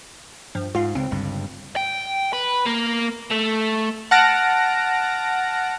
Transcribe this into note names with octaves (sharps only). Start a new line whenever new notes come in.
G2 F3
G#2 F4 F5
C#2 C4
G1 C#2 G2
G5
B4
A#3
A3
F#5 A5 F6 A#6 D7